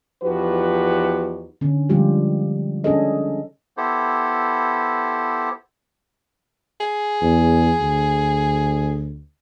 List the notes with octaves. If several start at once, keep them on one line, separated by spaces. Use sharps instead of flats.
E2 F3 D#4 F#4 G4 B4
D3 C#4
D3 F3 G3 G#3 F4 G4
C#4 D4 G#4 A4 D#5
B3 E4 G4 A4 C5
G#4
E2
D2